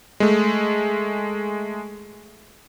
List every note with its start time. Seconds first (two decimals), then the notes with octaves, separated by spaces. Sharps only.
0.20 G#3 A3